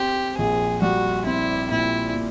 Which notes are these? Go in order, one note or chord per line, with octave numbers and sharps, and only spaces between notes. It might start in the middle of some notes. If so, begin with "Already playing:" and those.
Already playing: C4 G4
A#1 G#4
G3 F#4
C4 E4
A#2 E4
A#2